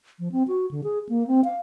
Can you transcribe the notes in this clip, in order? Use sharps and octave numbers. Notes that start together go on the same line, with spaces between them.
F3
C4
F#4
D3
G#4
A#3
C4
F5